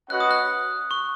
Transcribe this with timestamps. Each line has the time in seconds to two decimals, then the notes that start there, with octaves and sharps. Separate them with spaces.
0.10 C#4 F#4 B4 D#5 F#5 F#6
0.20 D#6
0.31 F#6
0.91 C#6